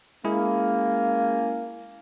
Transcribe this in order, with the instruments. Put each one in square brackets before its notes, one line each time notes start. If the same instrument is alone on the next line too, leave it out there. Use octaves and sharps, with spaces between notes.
[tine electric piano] G#3 E4 G#4 [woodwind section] A#3 C#4